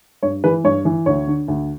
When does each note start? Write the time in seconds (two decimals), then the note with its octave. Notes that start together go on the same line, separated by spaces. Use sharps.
0.23 G2 C#5
0.44 E3 B4
0.64 G2 C#5
0.85 E3
1.06 D2 C#5
1.27 D3
1.48 D2